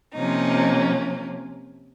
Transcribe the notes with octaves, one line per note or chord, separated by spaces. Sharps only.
C3 F3 A#3 C#4 D#4